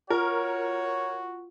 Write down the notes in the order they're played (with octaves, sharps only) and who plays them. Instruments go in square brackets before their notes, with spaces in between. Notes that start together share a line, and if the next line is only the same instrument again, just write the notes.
[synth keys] F4 [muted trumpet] F#4 [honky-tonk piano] A#4 [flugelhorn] C#5